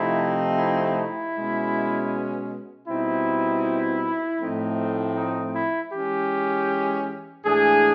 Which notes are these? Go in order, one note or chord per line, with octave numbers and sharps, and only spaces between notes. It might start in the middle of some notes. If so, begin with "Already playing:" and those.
Already playing: C3 F3 A3 C4 D#4 E4
E4
B2 G#3 C#4
B2 G3 C4 D#4 E4
A2 F3 A3 C4 D#4
D#4
E4
E3 G#3 C#4 G4
G#2 E3 A3 D4 G#4